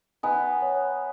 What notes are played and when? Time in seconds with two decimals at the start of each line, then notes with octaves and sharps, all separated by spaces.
0.23 B3 D#4 G#5
0.62 C#5